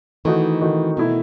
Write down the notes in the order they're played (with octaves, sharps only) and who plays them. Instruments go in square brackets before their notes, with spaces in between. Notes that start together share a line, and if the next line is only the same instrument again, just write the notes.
[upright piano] D#3 A3 D#4 F#4 [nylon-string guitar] E3
[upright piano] D#3 A3 D#4 F#4
[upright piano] B2 A3 E4 [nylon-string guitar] D#3